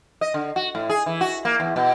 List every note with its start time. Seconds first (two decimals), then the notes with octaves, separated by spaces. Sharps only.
0.21 D#5
0.34 D3
0.56 F#4
0.75 A2
0.90 G#4
1.06 E3
1.21 F#4
1.45 A#3
1.60 E2
1.76 B2